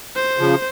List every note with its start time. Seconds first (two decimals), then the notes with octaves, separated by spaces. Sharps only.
0.16 C5
0.39 C#3 F3